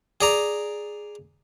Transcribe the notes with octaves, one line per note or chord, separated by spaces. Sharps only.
G#4 D5 A#5